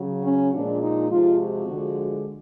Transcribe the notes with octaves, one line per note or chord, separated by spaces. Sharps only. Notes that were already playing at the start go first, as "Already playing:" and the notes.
Already playing: C#3 F#3
C#4
A#2 F3 G#3 D4
D#4
C3 F3 G#3 F4
F#4
D3 F3 G#3